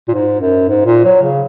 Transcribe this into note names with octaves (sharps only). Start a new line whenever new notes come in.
A#2
G#2
F#2
G#2
A#2
F#3
C#3